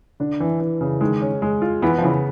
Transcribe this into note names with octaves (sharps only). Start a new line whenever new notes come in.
D3 D4
E3
E3
C#3
D#3 G#3
C#4
G#3
F4
E3 B3
F3
C#3 E3